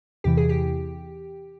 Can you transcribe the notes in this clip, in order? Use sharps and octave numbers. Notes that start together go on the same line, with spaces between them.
E2 C3 E3 G4
G#4
G4